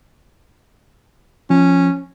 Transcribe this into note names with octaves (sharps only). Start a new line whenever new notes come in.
F3 C#4